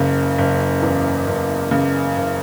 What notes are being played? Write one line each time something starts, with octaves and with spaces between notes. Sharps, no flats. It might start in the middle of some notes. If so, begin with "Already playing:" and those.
Already playing: F#1 C#3
F#1
E2
F#1
C#3
F#1